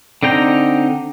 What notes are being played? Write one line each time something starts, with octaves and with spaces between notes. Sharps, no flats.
D3 C4 D#4 G5 A#5